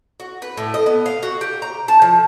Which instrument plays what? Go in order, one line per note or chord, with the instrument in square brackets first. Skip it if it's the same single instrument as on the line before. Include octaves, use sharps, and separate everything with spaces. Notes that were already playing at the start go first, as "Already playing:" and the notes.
[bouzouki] F#4
B4
A2
D#5
B3
F5
F#4
G4
A#5
A5
F3